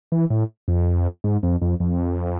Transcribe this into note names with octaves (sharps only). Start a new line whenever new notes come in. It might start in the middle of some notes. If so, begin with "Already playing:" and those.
E3
A2
F2
G#2
F2
F2
F2